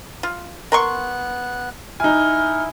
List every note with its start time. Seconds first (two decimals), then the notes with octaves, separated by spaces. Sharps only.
0.23 F4
0.72 B3 A#4 C6 C#6 F#6
2.00 D#4 E4 G#5 F6